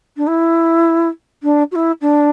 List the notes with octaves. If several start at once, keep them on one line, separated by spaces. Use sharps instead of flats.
D4
E4
D4
F#4
E4
D4